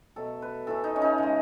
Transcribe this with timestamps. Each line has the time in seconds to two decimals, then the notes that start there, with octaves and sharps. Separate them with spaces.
0.16 B2 F#3 A3 A4
0.42 B4
0.67 A2 E3 A3 A4
0.84 D#4
0.96 C#4
1.02 D#4
1.18 C#3 G#3